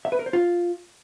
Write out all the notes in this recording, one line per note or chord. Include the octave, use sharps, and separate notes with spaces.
E5
B4
A#4
C5
F4